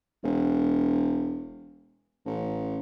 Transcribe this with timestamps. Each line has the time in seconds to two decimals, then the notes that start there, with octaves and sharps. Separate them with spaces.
0.24 E1
2.26 A1